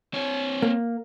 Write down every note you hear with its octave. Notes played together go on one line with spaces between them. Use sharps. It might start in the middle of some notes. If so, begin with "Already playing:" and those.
C4 C#5
A#3